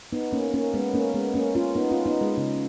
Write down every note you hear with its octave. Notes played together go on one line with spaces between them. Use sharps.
B3 D#4
A#3 C#4
A#3 C#4
G#3 B3
A#3 C#4
G#3 B3
A#3 C#4
C#4 F4
B3 D#4
C#4 F4
B3 D#4
G#3
C#3